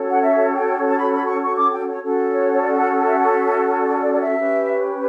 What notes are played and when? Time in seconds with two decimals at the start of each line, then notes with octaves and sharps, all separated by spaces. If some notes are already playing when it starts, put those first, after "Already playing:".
Already playing: C#4 F#4 A4 C#5
0.09 F#5
0.24 E5
0.54 G5
0.89 A5
0.98 B5
1.13 B5
1.27 C#6
1.43 C#6
1.57 D6
1.72 G5
1.88 C#5
2.01 C#4 F#4 A4
2.31 C#5
2.52 C#5
2.61 D5
2.76 F#5
3.05 E5
3.17 F#5
3.29 E5
3.80 D5
4.00 D5
4.13 D5
4.20 E5
4.39 C#4 G4 B4